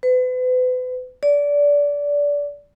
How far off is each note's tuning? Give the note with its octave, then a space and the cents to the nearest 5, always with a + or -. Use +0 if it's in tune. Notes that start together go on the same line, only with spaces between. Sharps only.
B4 +40
D5 -20